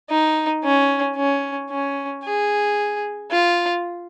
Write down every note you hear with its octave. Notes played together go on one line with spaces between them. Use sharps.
D#4
C#4
C#4
C#4
G#4
F4